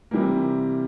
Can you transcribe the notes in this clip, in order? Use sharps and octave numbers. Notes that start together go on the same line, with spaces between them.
C3 E3 G3 A#3